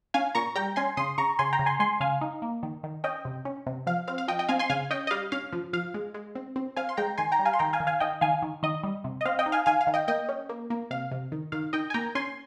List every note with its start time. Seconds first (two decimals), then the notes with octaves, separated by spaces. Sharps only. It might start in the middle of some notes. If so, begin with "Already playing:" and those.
0.14 C#4 F5 G#5
0.35 A#2 A#5 C#6
0.55 G3 G5 A#5
0.76 C#4 G#5 C6
0.97 C#3 C6 D#6
1.18 C#3 A#5 C#6
1.39 C#3 G#5 C6
1.53 G5 A#5
1.59 C#3
1.66 G#5 C6
1.79 G#3 G#5 C6
2.00 C#3 F5 G#5
2.21 D#4
2.42 A#3
2.63 D#3
2.84 D#3
3.04 C#4 D#5 G5
3.25 C3
3.45 C#4
3.67 C3
3.86 F3 F5
4.08 C4 F5
4.18 F5
4.28 F3 D#5 G5
4.39 D#5 G5
4.49 C4 F5 G#5
4.59 G#5 C6
4.70 C#3 F5 G#5
4.91 C#4 D#5 G5
5.07 D#5
5.11 G3 F5
5.32 C#4 F5
5.53 F3
5.73 F3 F5
5.94 G#3
6.14 G#3
6.35 C4
6.56 C4
6.76 C4 F5 G#5
6.89 C6
6.97 G#3 G5 A#5
7.18 D#3 G#5 C6
7.32 G5 A#5
7.39 G3
7.45 F5 G#5
7.53 C6
7.59 D#3 G5 A#5
7.73 F5 G#5
7.80 D#3
7.87 F5 G#5
8.00 D#3 D#5 G5
8.21 D#3 F5 G#5
8.42 D#3
8.63 D#3 D#5
8.84 G3
9.04 C3
9.21 D#5
9.25 C4 F5
9.39 D#5 G5
9.46 D#4
9.52 F5 G#5
9.66 D#3 F5 G#5
9.81 F5
9.87 D#3
9.94 D#5 G5
10.08 A#3 D#5 G5
10.29 C#4
10.49 A#3
10.70 A#3
10.90 C3 F5
11.11 C3
11.32 D#3
11.52 D#3 F5
11.73 D#3 D#5 G5
11.90 G#5
11.94 A#3 G5 A#5
12.15 C#4 G#5 C6